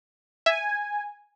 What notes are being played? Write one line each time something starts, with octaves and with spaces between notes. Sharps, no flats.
E5 G#5